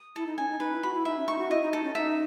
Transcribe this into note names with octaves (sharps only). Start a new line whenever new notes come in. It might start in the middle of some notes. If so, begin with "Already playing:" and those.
Already playing: D#6
E4 A4
D#4
C#4 G#5
D#4
D#4 B4
E4
F#4 B5
E4
D#4 E5
C#4
D#4 C#6
F#4
E4 D#5
D#4
D#4 A4
C#4
D#4 E5